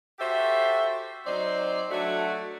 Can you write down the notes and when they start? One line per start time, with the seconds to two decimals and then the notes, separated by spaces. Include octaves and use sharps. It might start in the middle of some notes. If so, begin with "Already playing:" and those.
0.19 F#4 G4 A4 C5 E5
1.26 F#3 C4 D#4 C5 D5
1.90 F#3 A3 D4 F#4